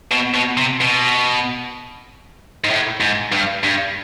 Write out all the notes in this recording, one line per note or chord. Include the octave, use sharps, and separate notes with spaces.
B2
B2
C3
B2
G#2
A2
G#2
G2
G2